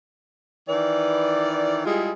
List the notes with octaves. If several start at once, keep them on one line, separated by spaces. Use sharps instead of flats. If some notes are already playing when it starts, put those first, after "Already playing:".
D#3 E3 B4 D5
G3 G#3 E4 F4 G#4